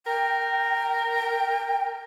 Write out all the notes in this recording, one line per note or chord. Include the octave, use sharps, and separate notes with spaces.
A#4 G5